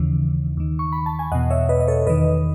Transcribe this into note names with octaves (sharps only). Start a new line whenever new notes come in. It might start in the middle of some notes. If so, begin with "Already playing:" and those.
Already playing: D#2 C#3 E3
D#2 D#3
C#6
B5
A5
G#5
E2 B2 D#5 F#5
C#5 E5
B4 D#5
D#5
A4 C#5
E2 D#3 B4 D#5